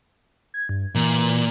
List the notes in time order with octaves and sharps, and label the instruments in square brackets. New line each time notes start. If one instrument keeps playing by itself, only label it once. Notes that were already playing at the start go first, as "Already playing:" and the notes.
[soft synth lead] G#6
G2
[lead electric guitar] A#2 [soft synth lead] E3